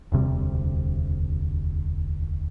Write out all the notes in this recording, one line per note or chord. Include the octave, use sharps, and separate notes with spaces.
E1 D2 C3 G3